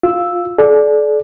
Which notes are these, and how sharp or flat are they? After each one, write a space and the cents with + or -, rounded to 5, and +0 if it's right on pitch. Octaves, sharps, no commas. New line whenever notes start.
F4 +0 E6 +0
A4 -45 D5 +0